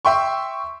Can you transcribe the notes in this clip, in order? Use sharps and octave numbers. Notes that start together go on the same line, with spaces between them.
E5 G5 C6 C#6